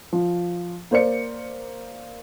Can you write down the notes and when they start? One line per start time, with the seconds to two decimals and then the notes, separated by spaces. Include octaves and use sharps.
0.13 F3
0.91 A#3 C5 D5 C#7